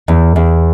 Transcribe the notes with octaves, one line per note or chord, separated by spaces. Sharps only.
E2
E2